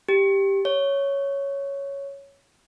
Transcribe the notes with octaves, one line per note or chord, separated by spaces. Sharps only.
G4
C#5